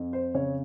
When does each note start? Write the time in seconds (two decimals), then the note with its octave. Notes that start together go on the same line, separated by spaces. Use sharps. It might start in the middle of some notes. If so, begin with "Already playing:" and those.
Already playing: F2
0.13 C5
0.34 C#3 C#5